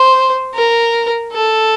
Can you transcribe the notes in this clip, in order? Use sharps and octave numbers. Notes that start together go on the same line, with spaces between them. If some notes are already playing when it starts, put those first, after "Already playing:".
Already playing: C5
A#4
A4